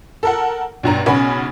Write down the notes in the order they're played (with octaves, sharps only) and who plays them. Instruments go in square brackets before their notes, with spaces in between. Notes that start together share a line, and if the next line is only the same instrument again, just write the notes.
[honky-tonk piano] A4 A#4 F#5
B1 G2 A#5
B1 C#3 B3 C#4 B5